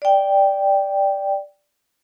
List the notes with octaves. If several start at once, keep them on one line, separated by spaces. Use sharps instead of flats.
D5 G5